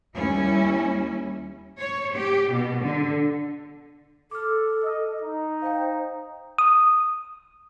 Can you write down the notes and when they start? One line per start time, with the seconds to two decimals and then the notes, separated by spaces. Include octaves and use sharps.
0.16 D#2 G3 C#4 E4
1.80 C#5
2.16 G4
2.52 B2
2.82 D3
4.31 A4 D6 F6
4.84 D#5
5.22 D#4
5.62 C5 F5 G5
6.58 D#6